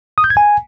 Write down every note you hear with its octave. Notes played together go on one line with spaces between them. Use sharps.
D#6
G6
G#6
G#5